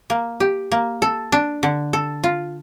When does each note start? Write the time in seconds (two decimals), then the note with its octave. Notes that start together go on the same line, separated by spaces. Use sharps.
0.10 A#3
0.40 G4
0.72 A#3
1.02 A4
1.32 D4
1.63 D3
1.93 A4
2.24 F4